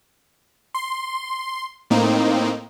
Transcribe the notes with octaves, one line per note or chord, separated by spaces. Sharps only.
C6
A2 A#3 C4 D#4